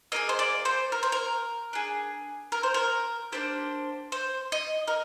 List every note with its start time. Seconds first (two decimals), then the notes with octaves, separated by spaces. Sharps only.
0.12 A#3 D4 G#4 D#5
0.29 C5
0.39 D5
0.65 C5
0.92 A#4
1.03 C5
1.12 A#4
1.73 D4 G#4
2.52 A#4
2.63 C5
2.74 A#4
3.32 A#3 D4 G4 C5
4.12 C5
4.52 D#5
4.88 A#4